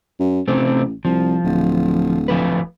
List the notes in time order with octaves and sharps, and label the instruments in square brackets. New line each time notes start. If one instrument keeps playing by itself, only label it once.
[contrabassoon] F#2
[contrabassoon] A1 [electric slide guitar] C3 A3 C4
[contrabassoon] C2 [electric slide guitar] F3
[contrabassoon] D1
[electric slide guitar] F3 A3 B4